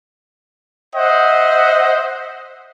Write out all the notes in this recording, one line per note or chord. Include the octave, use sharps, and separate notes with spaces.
C5 D#5 E5 F#5